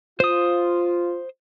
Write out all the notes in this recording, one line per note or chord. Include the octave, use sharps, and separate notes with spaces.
F4 C5 D#6